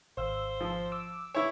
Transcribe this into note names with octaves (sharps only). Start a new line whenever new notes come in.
G#1 C5 F5 E6
F3
D6 E6
E4 C#5